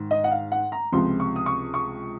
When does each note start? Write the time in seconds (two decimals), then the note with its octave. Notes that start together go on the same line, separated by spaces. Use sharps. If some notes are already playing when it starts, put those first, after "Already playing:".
Already playing: G#2 D#3
0.11 D#5
0.24 F#5
0.31 F5
0.52 F#5
0.72 A#5
0.92 C#2 C3 F3 C6
1.20 C#6
1.36 D#6
1.46 C#6
1.74 C#6